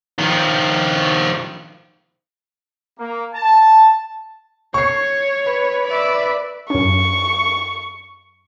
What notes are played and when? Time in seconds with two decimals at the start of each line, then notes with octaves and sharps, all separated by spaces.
0.19 D#3 F3
2.98 A#3
3.34 A5
4.74 C#5 C#6 C7
5.46 B4
5.87 D5 E5
6.70 F#2 C#4 C#6